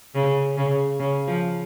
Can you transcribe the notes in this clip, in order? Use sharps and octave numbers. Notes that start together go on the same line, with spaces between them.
C#3
C#3
C#3
F3